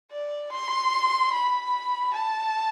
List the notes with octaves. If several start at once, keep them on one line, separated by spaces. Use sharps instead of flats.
D5
C6
B5
A5